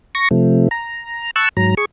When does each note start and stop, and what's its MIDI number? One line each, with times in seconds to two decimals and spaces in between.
0.15 0.28 85
0.15 0.28 94
0.31 0.68 48
0.31 0.68 53
0.31 0.68 57
0.71 1.31 82
1.36 1.49 81
1.36 1.49 85
1.36 1.49 88
1.36 1.49 90
1.57 1.75 44
1.57 1.75 54
1.57 1.75 82
1.77 1.85 68
1.77 1.85 85